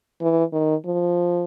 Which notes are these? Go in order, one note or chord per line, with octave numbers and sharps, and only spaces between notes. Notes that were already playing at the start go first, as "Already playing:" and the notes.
E3
D#3
F3